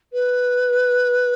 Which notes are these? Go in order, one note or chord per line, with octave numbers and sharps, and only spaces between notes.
B4